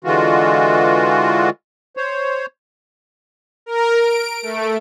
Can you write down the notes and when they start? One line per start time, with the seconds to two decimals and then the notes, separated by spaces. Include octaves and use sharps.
0.04 D3 E3 G#3 F4 F#4
1.97 C5 C#5
3.66 A#4
3.98 D7
4.42 A3